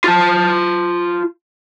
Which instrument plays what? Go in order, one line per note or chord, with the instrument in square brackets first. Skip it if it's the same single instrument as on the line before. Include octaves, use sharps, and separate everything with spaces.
[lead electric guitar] F4 A5